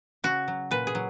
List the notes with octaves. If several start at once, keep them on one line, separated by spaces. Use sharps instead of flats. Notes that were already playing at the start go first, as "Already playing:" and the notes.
C#3 F#4
F#3
A#2 B4
G#4
F#3